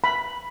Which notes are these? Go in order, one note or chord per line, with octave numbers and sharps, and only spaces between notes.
B5